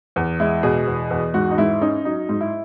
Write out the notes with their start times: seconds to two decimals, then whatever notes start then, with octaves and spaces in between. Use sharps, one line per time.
0.16 E2
0.40 G#3 E4
0.63 B2 G#4
0.87 E2
1.10 E2
1.34 G#2 F#4
1.51 D#4
1.58 G#2 E4
1.81 C#4 D#4
2.05 F#3 D#4
2.29 G#2
2.41 E4